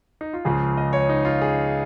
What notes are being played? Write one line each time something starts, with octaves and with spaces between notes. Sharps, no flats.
D#4
F4
C#2 C#3 F3 G#4
D#5
C#5
D#4
F4
G#4